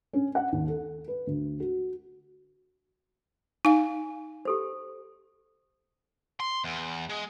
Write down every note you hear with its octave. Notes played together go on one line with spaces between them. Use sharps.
C#4
F#5
D#2
A4
B4
D2
F#4
D#4 F5 G#5
G4 A4 C5
C6
E2
G#3